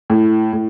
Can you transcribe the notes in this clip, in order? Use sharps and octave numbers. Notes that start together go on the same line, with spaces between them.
A2
A2